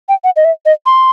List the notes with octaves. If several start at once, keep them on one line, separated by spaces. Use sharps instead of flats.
G5
F#5
D#5
E5
D#5
C6